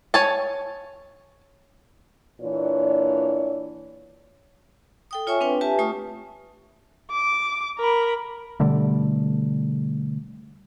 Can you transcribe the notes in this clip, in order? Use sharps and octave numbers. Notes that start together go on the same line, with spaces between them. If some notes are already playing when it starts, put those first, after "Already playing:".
C#5 G#5 A5
A#2 E3 D4 C#5
A4 G5 D#6
F4 C#5 E5 G#5 C#6
C4 D4 B4 G5
G4 B4 E5 G#5 A5
A3 F4 A5 C#6 D#6
D6
A#4 B5
B2 D3 G3 A3